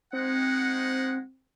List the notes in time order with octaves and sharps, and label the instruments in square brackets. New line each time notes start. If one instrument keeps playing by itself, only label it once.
[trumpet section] G#3 D#4 F#5 [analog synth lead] C4